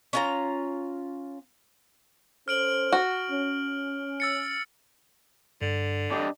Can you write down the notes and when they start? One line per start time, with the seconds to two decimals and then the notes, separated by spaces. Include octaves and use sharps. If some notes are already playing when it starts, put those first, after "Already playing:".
0.13 C#4 F4 A#5
2.48 C#4 A4 C5 F6 D7 F#7
2.92 F#4
3.30 C#4
4.20 E6 A6 C#7
5.62 G2 D3
6.11 D4 G4 D#5